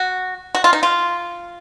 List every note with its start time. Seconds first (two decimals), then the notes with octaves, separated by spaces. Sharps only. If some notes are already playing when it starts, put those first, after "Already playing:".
Already playing: F#4
0.55 F#4
0.64 F4
0.73 D#4
0.83 F4